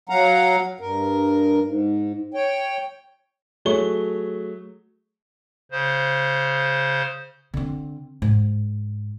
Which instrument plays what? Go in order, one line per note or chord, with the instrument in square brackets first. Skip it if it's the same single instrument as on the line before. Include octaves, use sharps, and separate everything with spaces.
[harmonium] F#3 F5 F#5 A#5
G2 A#4
G#2
C#5 G5
[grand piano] F#3 A3 G#4 C#5 C#6 G7
[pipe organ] C#3 C5
[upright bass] D3 C4
G#2